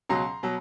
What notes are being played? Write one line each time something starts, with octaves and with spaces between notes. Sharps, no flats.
C#2 B2 F#3 A#5 C6
B2 F#3